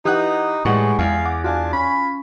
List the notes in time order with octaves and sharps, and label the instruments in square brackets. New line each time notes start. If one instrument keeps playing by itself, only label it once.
[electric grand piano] E3 D#6 F#6 [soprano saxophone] D#4 [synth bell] G4 F#5
[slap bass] A2 [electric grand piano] E3 G3 G#3 [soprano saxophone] G#4 [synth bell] F#5 C#6
[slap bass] E2 [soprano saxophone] F5 [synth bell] G#5
[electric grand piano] F#5 D6
[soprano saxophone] D4 [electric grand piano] F4 F5 G#5 [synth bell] F#4
[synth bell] C#4 [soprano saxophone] B5